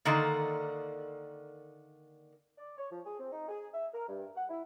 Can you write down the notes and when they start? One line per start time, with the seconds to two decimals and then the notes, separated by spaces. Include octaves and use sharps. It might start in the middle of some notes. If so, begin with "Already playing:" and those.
0.05 D3 D#3 A#3
2.58 D5
2.77 C#5
2.91 F3
3.05 G#4
3.19 C4
3.33 D#4
3.49 G#4
3.73 E5
3.94 A#4
4.08 G2
4.35 F#5
4.50 E4